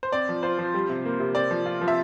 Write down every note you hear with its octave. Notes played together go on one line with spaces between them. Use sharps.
C5
C4 D5
F3
F4 C5
F3
G3
C3
A#3
C3
C4 D5
F3
F4
F3
E5